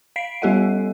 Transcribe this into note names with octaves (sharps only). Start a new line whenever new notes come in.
F5 B6 C7 D7
G3 B3 G4 A4 D#5 F#5